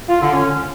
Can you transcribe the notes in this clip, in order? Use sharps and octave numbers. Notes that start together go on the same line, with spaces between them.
F4
D3
C#4